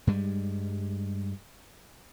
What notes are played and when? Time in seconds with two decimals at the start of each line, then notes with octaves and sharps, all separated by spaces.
0.07 G2 G3 G#3